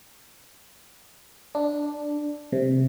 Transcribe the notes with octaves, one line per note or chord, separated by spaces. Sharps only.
D4
C3